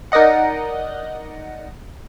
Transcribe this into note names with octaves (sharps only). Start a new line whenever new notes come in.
D#4 A#4 D5 D#5 F#5